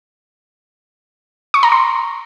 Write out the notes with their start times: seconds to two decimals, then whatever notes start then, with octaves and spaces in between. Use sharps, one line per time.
1.54 C#6
1.63 A#5
1.72 C6